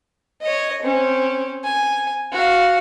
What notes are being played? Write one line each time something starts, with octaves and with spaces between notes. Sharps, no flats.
C#5 D#5
C4 C#4
G#5
F#4 F5